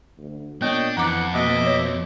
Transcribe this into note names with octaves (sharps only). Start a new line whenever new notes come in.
D2
A#2 B3 D4 C#5 D#5 G5
F2 E3 F#5 A#5 D6
B2 A#3 D#5 E5 D6
C#5